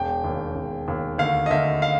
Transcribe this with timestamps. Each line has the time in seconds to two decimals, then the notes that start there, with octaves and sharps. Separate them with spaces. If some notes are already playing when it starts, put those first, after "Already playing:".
Already playing: E1 G5
0.24 D#2
0.56 E1
0.88 D#2
1.18 D2 F5
1.46 D#5
1.50 D2 E5
1.82 F5